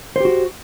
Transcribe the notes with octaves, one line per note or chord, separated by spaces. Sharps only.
F#4 G4 C5